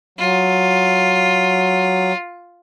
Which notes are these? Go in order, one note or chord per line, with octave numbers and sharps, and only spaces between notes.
F#3 F4